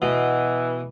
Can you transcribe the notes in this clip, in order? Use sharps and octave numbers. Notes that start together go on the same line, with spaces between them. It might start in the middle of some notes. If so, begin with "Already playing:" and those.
B2 E3